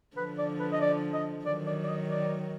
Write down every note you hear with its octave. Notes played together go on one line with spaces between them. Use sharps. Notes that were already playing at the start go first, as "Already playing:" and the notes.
D3 F3 B4
D5
B4
D#5
D5
D#5
D#3 F#3 D5
D5
D5
D#5
D5